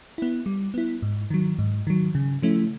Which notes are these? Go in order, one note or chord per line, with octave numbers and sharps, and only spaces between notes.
B3 E4
G3
B3 E4
G#2
D#3 F#3
G#2
D#3 F#3
C#3
F3 A3 C#4 E4